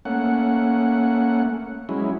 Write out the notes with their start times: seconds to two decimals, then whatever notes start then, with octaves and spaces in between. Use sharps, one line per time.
0.05 A3 A#3 C#4 F#5
1.89 F#3 G#3 C#4 E4